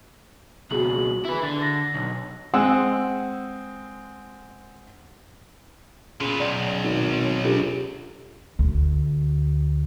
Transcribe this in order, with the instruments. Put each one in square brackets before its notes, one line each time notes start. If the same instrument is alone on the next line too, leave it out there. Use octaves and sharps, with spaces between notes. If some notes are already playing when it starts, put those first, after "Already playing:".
[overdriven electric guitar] C#2 B2 [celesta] F#4 G#4 F#7
[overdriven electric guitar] E4 B4
[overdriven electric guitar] D3 [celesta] A6
[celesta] A#6
[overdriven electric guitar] B1
[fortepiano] G#3 C4 F#5 E6
[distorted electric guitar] A#2 B3 [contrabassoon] C#3
[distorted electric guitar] B1 [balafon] D5
[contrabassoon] G#1
[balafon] C#5
[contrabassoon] C#2 [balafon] D4 G4 A4
[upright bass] D2